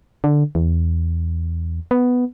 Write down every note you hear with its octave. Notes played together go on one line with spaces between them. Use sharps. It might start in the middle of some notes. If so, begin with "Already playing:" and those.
D3
E2
B3